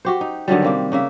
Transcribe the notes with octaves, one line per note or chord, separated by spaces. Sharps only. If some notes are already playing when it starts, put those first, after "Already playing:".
F#4 G4 C5
D#4
D3 D#3 F#3 G3
C3 A#3 C4
C#3 A#3 E5